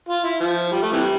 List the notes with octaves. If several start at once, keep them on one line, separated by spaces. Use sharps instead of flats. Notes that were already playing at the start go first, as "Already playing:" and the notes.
F4
E4
F3
G3
A3
C3 E3 G3